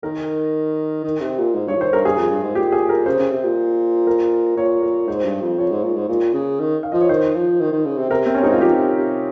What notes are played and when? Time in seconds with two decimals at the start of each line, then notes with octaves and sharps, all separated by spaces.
0.03 D#3 A#4
1.04 D#3
1.21 C3
1.39 A#2
1.55 G#2
1.67 G2 C#5
1.75 F3
1.80 D#3 C5
1.92 G2 A#4
2.05 G2 G#4
2.17 F2
2.30 G2
2.43 G#2
2.55 A#2 G4
2.72 G#4
2.89 A#4
3.06 C#3 C5
3.19 C#3
3.32 C3
3.44 A#2
4.07 A#4
4.57 A#2 C#5
4.83 A#4
5.08 G#2 C5
5.25 G2
5.41 F2
5.58 F2 C#5
5.72 G#2
5.84 A#2
5.96 G#2
6.08 A#2
6.34 C#3
6.60 D#3
6.83 F5
6.92 F3 D#5
7.01 C#5
7.09 D#3 C5
7.35 F3
7.61 D#3
7.72 D#3
7.86 C#3
7.98 C3
8.10 C3 A#4
8.26 C3 C4
8.35 C#4
8.44 G#2 D#4
8.52 F4
8.61 F3 G4
8.74 C3
8.98 C3